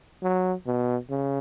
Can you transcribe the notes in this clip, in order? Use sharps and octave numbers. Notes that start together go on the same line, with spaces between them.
F#3
B2
C#3